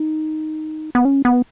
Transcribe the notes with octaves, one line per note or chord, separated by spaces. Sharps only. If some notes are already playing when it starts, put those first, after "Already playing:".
Already playing: D#4
B3
C#4
B3